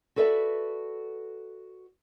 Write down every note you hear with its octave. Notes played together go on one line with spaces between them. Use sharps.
F#4 A4 B4 D5 E5